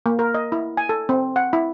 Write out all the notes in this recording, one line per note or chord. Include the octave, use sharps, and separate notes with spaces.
A#3
A#4
D#5
E4
G#5
A4
C4
F#5
E4